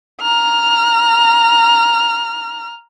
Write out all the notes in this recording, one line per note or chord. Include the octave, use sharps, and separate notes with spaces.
A#5 F6